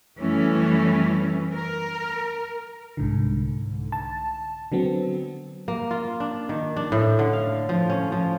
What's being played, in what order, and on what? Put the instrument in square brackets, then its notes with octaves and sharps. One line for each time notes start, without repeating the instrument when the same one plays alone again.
[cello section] F#2 E3 G3 A3 C#4
A#4
[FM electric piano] C2 G#2 D3
A5
D3 F#3 B3 C4
[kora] A#3
F4
D4
D#3
D4
A2
D3
F5
F3
C#4
F3